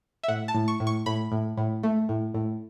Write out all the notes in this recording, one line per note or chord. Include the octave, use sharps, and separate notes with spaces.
E5
A2 F#5
A5
A2
C#6
A2
C#6
A2 B5
A2
A2
A3
A2
A2